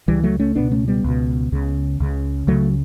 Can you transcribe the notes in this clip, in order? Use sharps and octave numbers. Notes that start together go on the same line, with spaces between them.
C#2 C#3 E3 G3
F#3 A3
A3 C#4
C#2 B2 B3 D4
A3 C#4
G3 B3
C#2 B2
C#2 C#3
C#2 C#3
C#2 C#3 F#3 A3